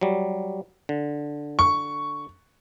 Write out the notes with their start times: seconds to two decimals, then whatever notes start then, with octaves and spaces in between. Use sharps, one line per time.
0.01 F#3 G3
0.89 D3
1.59 C#6